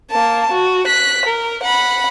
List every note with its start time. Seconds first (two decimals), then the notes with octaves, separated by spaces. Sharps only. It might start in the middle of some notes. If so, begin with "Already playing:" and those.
0.11 A#3 A5
0.52 F#4
0.87 F#6 B6
1.25 A#4
1.63 F#5 B5